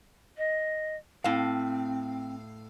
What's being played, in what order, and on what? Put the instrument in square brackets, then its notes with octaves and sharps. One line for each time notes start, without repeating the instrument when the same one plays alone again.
[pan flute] D#5
[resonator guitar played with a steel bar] A2 F5 [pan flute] C4